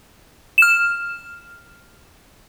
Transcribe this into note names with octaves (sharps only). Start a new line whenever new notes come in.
F6 E7